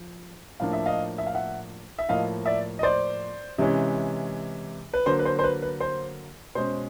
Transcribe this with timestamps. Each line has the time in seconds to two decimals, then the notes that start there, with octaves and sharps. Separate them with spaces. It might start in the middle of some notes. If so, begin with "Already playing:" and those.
Already playing: F3
0.60 A2 F3 A#3 D4 F5
0.73 E5
0.86 D#5 F5
1.18 E5
1.27 F5
1.35 E5 F#5
1.98 E5
2.09 A2 F3 A#3 D#5 F5
2.46 D5 E5
2.79 D#5
2.83 C5 D5
3.58 C3 E3 G#3 C#4
4.93 B4
5.06 D3 F#3 A#3 C5
5.19 B4
5.25 C5
5.39 C5
5.44 B4
5.62 B4
5.80 C5
6.55 B2 G#3 C#4 C5